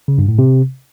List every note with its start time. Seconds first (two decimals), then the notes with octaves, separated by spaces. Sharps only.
0.08 C#3
0.18 G2
0.28 A2
0.39 C3